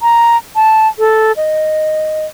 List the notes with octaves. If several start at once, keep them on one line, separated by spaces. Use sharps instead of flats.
A#5
A5
A4
D#5